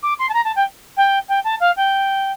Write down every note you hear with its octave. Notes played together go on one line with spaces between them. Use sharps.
D6
C6
A5
A#5
A5
G5
G5
G5
A5
F5
G5